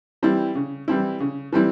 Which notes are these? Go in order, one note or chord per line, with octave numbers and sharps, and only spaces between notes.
E3 G3 C4 E4
C#3
E3 G3 C4 E4
C#3
E3 G3 C4 E4